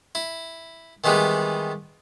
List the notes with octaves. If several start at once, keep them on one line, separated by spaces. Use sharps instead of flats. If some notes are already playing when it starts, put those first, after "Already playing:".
E4
D#3 E3 G3 G#3 B3